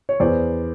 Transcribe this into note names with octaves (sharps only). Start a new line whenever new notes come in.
C#5
E2 C5 D5